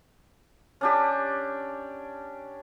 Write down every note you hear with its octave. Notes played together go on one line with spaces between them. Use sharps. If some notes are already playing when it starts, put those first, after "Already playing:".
C#4 D4 G4